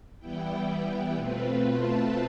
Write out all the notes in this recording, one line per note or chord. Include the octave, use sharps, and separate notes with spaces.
E3 G3 B3 E4 G5
B2 A3 C4 F4 B4
B4
A5